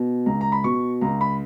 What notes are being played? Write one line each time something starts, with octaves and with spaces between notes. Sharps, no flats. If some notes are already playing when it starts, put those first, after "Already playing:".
Already playing: B2
C#2 A#5
A#5
B5
B2 C#6
C#2 A#5
B5